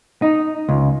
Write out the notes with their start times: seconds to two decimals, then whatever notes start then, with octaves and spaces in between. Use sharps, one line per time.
0.22 D#4
0.69 C#2